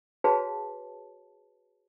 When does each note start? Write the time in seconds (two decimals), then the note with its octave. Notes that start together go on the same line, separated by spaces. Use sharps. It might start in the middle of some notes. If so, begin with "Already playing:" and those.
0.24 F#4 G#4 B4 C#5 F5 A5